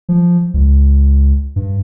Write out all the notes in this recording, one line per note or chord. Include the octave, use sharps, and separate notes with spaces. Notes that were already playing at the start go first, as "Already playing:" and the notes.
F3
C#2
G2